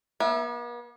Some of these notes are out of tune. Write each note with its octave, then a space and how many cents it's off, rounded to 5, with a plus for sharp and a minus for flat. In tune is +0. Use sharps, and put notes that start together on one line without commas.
B3 -45 E5 +0